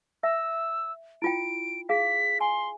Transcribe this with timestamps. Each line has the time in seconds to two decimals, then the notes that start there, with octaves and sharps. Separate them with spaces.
0.23 E5 E6
1.22 E4 F4 G5 D7
1.89 G#4 F5 B6
2.40 G#5 C6